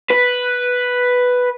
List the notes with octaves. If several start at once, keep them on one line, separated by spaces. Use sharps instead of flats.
B4